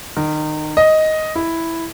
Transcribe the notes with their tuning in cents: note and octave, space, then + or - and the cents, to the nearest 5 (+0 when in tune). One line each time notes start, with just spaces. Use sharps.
D#3 -25
D#5 +5
E4 +0